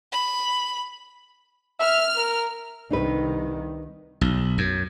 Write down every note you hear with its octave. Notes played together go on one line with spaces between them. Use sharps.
B5
E5 F6
A#4
C2 C3 D#3 D4 D#4 B4
B1
F#2